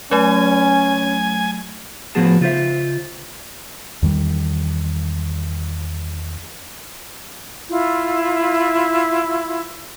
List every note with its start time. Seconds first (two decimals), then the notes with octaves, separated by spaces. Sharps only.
0.11 F#3 A3 C#4 G#5
2.15 A2 F3 B3 F#4 G#4 A5
2.41 C#3 F4 G#4 C5 E5
4.02 E2 D#3 G3
7.68 E4 F4